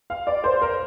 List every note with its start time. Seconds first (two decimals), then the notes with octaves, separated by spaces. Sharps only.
0.10 F5
0.27 D5
0.44 C5
0.61 A#4